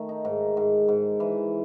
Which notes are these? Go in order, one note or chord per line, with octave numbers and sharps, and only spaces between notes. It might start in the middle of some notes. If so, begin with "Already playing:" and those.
Already playing: D#3 A3
D#4
G#2
G#2
G#2
E3